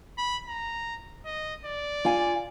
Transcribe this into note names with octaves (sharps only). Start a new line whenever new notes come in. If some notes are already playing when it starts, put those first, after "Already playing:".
B5
A#5
D#5
D5
F4 F5 G#5